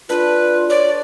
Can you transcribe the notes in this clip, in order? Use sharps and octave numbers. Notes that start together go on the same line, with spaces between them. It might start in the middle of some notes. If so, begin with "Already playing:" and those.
D4 F4 A4 B4
C#5 D5